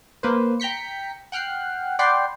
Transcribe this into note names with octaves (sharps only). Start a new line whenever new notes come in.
A#3 B4 C5
G5 A#5 G6 B6 C#7
F#5 G5 F6 F#6 C7
D5 F#5 G5 B5 C6 C7